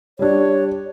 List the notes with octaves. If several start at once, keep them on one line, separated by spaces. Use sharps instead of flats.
G3 D4 C#5